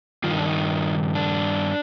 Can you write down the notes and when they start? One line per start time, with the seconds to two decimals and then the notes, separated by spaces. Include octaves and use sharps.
0.24 G2 D#3 F4
0.31 D#4
0.38 D4
0.46 D#4
1.15 D4